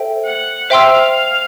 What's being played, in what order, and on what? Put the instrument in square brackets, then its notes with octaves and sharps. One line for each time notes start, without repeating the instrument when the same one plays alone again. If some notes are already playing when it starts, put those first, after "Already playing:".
Already playing: [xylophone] A4 C5 E5 G5
[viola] F#5
[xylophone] C5 E5 G5 C6 E6 [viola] F5